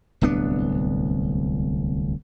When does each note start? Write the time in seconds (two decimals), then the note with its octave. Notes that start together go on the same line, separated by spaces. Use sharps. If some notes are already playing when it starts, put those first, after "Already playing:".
0.21 D1 C2 B3 D4